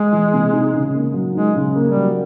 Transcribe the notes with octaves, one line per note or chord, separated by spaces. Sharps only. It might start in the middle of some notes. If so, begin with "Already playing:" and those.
Already playing: G#3
E3
C3
D#4
C#3
A#3
F#3
G#3 D#4
C#3
A#3
G3
F#3